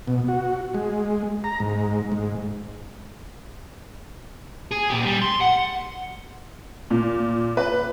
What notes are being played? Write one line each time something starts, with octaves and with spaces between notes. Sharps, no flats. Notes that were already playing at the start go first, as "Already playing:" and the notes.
B2
F#4
G#3
A#5
G#2
G#2
G#4
A#2 G4
G3
C6
F#5
A#2
B4